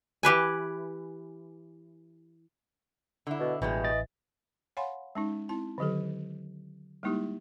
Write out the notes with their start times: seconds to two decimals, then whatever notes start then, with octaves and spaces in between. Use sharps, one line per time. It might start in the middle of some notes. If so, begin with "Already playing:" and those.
0.23 E3 G4 B4 G#5
3.27 D3 E4
3.40 B2
3.62 A1 B2 E3 G3 G#3
3.84 D#5 A6
4.77 C#5 F5 F#5 G#5 B5 C6
5.15 G#3 C#4 D#4
5.49 C4 E4 A5
5.78 D3 D#3 F#3 G4 A4
7.03 G3 G#3 A#3 D#4 E4 G4